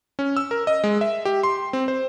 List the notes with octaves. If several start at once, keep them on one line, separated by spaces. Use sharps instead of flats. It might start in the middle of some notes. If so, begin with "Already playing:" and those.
C#4
E6
A#4
D#5
G#3
E5
G4
C6
C4
C5